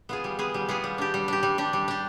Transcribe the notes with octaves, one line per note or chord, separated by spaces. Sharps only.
B3 F4 G#4
G3
B3 F4 G#4
G3
B3 F4 G#4
G3
D4 G4
G3
D4 G4
G3
D4 G4
G3
D4 G4